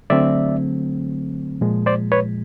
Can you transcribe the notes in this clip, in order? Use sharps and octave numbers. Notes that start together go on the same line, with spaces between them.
D3 F#3 A3 C4 D5 E5
A#2 F3 G#3
C5 D5
B4 C#5